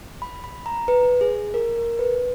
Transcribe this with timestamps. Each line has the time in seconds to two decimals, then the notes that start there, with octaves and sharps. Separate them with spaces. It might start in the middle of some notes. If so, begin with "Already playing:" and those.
0.22 B5
0.44 B5
0.66 A#5
0.88 B4
1.21 G#4
1.54 A#4
1.76 A#4
1.99 B4